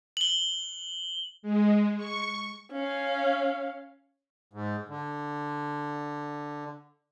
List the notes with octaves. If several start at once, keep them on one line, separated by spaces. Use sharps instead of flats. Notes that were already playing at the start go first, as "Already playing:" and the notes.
F#7 G7
G#3
C#6
C#4 F5
G#2
D3